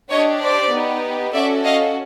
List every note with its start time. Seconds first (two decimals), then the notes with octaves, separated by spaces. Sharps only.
0.10 D4 G4 C#5 D#5
0.41 C5 D5
0.71 B3 D#4 G4
1.33 C#4 F#4 A4 D5 E5
1.64 D#5 F5